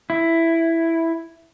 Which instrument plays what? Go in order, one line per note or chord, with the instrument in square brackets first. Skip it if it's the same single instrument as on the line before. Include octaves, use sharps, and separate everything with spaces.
[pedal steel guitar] E4